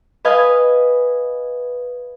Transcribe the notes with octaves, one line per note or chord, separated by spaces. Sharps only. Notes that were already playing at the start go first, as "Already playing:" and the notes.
B4 D#5 F5 G#5